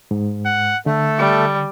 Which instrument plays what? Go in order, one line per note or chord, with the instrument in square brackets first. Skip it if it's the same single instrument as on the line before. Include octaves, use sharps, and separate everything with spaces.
[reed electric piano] G#2
[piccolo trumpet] F#5
[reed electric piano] D3 [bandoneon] A3 [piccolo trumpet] A4
[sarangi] G3